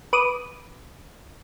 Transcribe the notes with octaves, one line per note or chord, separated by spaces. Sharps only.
B4 D6 D#6